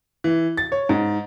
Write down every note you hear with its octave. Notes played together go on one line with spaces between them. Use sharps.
E3
A6
C#5
G#2